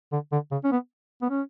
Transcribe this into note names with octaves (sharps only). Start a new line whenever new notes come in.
D3
D3
C#3
C#4
B3
B3
C#4